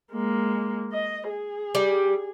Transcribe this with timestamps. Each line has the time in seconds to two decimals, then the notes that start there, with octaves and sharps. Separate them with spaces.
0.12 G#3 A#3
0.93 D#5
1.30 G#4
1.75 G3